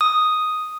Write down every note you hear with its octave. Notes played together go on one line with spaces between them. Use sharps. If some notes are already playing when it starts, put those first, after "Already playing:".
D#6